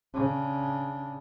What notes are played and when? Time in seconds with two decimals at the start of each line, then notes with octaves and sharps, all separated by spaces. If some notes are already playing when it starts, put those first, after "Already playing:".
0.14 C#3 D4